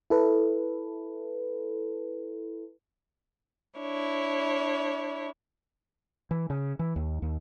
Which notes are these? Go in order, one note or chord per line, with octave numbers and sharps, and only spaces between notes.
E4 A4 B4
D4 E4 C#5
E3
C#3
E3
D#2
D#2